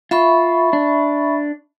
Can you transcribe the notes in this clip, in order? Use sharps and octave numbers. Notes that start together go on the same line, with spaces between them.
F4 E5 B5 C#6
D4